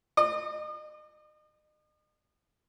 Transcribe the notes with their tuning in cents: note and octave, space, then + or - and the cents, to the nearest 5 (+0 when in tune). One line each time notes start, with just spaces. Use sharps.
D#5 -40